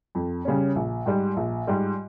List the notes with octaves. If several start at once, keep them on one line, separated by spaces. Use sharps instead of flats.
F2
C#3 G3 C#4
A#1
G#2 G3
A#1
G#2 G3